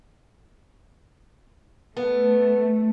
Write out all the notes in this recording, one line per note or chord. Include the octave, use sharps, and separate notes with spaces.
A3 B3